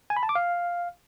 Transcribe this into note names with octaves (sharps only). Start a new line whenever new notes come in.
G#5
B5
A5
D6
F5